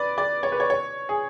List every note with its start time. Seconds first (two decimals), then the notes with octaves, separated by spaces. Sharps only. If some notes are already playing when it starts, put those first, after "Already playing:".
Already playing: B4 D5
0.18 D5
0.43 C#5
0.52 B4
0.60 C#5
0.70 C#5
1.09 G#4